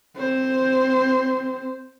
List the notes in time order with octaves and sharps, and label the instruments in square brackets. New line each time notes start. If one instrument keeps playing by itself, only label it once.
[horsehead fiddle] C4 C5